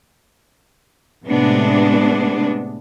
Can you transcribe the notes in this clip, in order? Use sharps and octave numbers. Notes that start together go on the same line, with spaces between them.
A2 C3 G#3 B3 D4